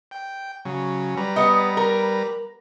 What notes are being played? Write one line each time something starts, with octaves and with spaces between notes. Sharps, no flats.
G5
C#3 F#3
G3 B4 A#5
B3 D#5
A#4